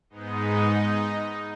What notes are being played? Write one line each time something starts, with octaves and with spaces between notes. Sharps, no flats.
G#2 G#3 B3 D#4